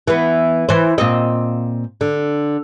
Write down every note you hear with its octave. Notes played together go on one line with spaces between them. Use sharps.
E3 B3
E3 C5
A#2 C4 D#5
D3